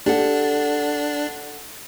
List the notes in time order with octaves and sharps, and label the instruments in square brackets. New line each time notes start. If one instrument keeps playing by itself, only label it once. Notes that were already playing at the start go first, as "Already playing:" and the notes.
[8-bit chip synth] D4 [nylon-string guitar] G4 A4 F#5